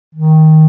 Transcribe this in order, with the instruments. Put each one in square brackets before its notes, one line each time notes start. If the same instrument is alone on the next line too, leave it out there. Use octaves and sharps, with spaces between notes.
[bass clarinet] D#3